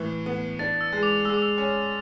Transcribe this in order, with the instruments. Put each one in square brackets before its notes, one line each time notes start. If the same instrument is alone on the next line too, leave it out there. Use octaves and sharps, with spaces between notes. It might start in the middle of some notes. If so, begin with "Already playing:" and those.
Already playing: [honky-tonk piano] A2 E3
B3
[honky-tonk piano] D4 [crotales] A6
[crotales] E6
[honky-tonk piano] G#3
[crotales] D6
[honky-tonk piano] G#3 [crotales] E6
[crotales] D6
E6
[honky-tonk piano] C#4